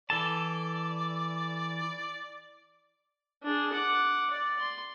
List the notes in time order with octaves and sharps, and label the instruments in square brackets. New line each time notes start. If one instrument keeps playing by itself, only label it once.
[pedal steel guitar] E3 A4 A5 [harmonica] D5
[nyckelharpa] D4 G#4
F#5 D6
D5
C6